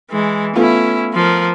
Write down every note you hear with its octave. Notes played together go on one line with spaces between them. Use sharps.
E3 G#3
A3 B3 C#4 E4 F4
F3 A#4